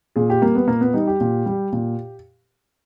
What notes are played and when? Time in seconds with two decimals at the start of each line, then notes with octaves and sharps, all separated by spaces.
0.16 A#2 G#4
0.30 G4
0.42 G3 A#3
0.55 B3
0.68 A#2 A#3
0.81 B3
0.94 G3 D#4
1.08 G4
1.20 A#2
1.46 G3
1.72 A#2